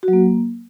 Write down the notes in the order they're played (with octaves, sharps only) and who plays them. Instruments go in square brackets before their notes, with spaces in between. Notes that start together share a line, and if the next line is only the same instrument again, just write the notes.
[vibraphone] F#4
F#3
A#3